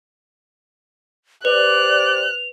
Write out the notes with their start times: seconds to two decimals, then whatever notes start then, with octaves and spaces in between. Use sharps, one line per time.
1.45 G4 B4 C5 D5 F#6 F7